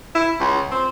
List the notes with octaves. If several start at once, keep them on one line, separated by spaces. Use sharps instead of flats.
E4
C#2
C4